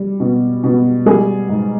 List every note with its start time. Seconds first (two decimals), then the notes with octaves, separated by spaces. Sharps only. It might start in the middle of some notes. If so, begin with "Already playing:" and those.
Already playing: G3
0.20 B2
0.64 B2
1.06 G3 G#4
1.49 G#2